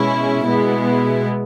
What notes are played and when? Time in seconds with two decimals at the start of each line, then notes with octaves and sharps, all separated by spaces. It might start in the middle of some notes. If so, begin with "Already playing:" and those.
Already playing: B2 G#3 C#4 E4
0.46 B2 G#3 B3 E4